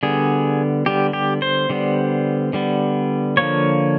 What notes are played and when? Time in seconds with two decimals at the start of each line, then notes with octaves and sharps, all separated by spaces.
0.03 D3 G3 B3 G#4
0.86 D3 G3 B3 G4
1.13 G4
1.42 C5
1.70 D3 G3 B3
2.53 D3 G3 B3
3.37 D3 F3 A#3 C#5